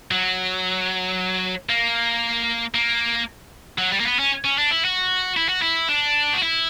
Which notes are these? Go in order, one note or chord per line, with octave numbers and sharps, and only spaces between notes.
F#3
A#3
A#3
F#3
G3
A#3
B3
C#4
C#4
D4
E4
F#4
E4
F#4
E4
D4
F#4
E4